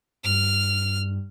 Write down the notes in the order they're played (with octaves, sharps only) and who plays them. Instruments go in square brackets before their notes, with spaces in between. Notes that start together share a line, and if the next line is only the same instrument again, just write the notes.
[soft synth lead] G2 [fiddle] F6